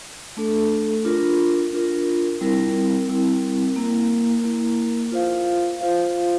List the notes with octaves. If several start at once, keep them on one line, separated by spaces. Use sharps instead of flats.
A3 D4 A4
D4 F4 A#4
D4 F4 A#4
G3 C4 E4 A#4
G3 C4 E4 A#4
A#3 E4 A#4
A#3 E4 A#4
F4 C5 F5
F4 C5 F5